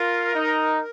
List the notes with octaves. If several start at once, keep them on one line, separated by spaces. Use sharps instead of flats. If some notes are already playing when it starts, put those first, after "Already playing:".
Already playing: F4 A#4
D#4